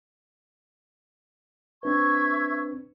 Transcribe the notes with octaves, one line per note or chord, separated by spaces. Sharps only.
C4 D4 B4 E5 C#6 G#6